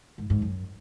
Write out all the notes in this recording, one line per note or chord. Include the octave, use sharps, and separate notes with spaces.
G#2
G#2
F#2